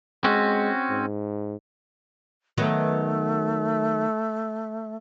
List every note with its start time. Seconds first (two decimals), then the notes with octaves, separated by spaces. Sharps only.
0.24 G#3 C4 C#4 F#4
0.90 G#2
2.58 D#3 F#3 A3 B3